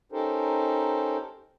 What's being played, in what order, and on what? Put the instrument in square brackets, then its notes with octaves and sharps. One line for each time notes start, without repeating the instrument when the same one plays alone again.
[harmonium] C#4 D#4 G4 A4 A#4 C5